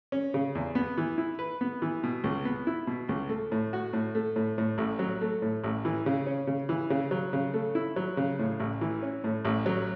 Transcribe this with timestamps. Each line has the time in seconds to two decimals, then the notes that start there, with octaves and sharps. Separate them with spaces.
0.12 C#4
0.34 C#3
0.55 E2
0.75 B3
0.98 E3
1.18 E4
1.39 B4
1.61 B3
1.82 E3
2.03 B2
2.24 C#2
2.45 B3
2.67 E4
2.87 B2
3.09 C#2
3.29 A3
3.52 A2
3.73 F#4
3.93 A2
4.15 A3
4.36 A2
4.58 A2
4.78 A1
4.99 F#3
5.21 A3
5.42 A2
5.64 A1
5.85 E3
6.06 C#3
6.26 C#4
6.47 C#3
6.69 E3
6.90 C#3
7.11 F#3
7.33 C#3
7.54 A3
7.75 E4
7.96 F#3
8.17 C#3
8.39 A2
8.60 A1
8.81 E3
9.02 C#4
9.24 A2
9.45 A1
9.66 F#3